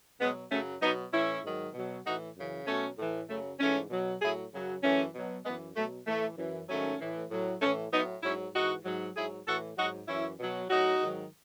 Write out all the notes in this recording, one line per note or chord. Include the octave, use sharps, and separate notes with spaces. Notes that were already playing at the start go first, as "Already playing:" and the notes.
B2 F#3 G#3 B3
F#2 C#3 F#3 A3 C#4
B2 F#3 B3 D#4
A2 E3 C#4 E4
G#2 D#3 F#3
B2 F#3
A2 E3 D#4 F#4
F#2 C#3 E3
B2 F#3 A3 C#4
A2 E3
F#2 C#3 F#3 A3
G#2 E3 A3 C#4
B2 F#3
A2 F#3 E4 G#4
F#2 C#3 F#3
F#2 E3 A3 C#4
B2 F#3
F#2 E3 G#3 B3
B2 F#3 A3
A2 E3 A3
F#2 E3
G#2 D#3 F#3 A3 C#4
A2 E3
A2 F#3
A2 E3 A3 C#4
A2 F#3 B3 D#4
G#2 F#3 C#4 E4
G#2 E3 D#4 F#4
G#2 F#3
G#2 F#3 E4 G#4
A2 E3 F#4 A4
G#2 F#3 D#4 F#4
F#2 E3 C#4 E4
B2 F#3
A2 F#3 D#4 F#4
G#2 D#3 F#3